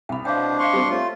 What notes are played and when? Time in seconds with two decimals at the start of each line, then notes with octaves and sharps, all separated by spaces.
0.09 C2 G5 B5
0.25 B2 D4 C5 F5 G5
0.59 C5 D#5 F5 C6 C#6
0.73 G3 C4 G4
0.89 A3 F4 C#5